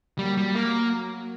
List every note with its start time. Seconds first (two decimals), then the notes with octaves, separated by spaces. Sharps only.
0.18 F#3 G3 A#3
0.37 G3
0.55 A#3